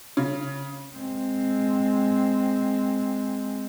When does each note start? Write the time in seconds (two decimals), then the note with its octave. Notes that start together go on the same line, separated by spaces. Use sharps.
0.17 C#3
0.96 G#3 C4